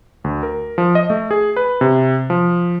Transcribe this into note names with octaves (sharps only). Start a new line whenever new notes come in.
D2
A#4
F3
D#5
A3
G#4
B4
C3
F3